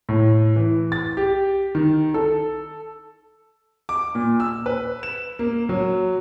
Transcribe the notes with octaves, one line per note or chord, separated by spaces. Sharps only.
A2
E3
A6
G4
D#3
A4
D6
A#2
E6
B4
E7
A#3
F#3